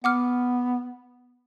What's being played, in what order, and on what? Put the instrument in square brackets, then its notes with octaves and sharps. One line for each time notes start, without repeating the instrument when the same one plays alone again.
[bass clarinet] B3 [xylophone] F#5 D6 F6